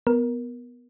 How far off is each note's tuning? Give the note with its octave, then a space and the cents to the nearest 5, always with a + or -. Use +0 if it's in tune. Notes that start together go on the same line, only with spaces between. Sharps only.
B3 +0 A#4 +15